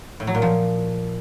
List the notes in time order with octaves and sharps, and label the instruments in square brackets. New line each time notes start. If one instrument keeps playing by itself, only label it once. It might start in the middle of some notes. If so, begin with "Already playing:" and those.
[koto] A2
F#3
A#2
F3